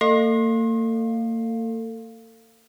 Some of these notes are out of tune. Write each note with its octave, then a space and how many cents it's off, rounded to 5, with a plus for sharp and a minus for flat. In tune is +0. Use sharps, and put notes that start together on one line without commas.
A#3 -40 A4 +30 F5 +0